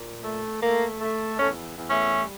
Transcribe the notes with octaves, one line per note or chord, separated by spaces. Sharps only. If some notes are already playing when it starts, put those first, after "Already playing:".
Already playing: A#2
A3
A3 A#3
A3
E2 A3 C#4
E2
A3 C#4
G3